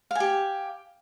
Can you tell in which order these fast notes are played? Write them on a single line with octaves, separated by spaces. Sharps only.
F5 G#5 G4